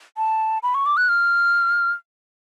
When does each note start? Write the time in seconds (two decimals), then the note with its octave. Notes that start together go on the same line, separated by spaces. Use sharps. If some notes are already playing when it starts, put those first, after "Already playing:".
0.17 A5
0.63 B5
0.75 C#6
0.86 D6
0.97 F#6
1.09 F6